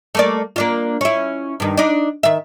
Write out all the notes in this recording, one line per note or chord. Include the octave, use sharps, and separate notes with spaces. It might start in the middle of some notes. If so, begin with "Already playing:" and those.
A3 A#3 D5
A#3 D4 F4
C#4 E4
G2 D#3
D4 D#4
D#3 E5